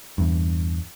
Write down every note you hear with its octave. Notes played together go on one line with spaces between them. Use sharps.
E2 G2